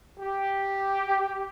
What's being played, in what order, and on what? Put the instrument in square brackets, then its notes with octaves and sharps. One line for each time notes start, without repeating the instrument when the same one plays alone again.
[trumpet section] G4